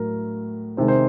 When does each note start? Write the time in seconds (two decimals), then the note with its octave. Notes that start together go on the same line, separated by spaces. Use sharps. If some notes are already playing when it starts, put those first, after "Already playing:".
Already playing: A2 F#3 A#4
0.77 C3 D#3 G#3 C5
0.88 C5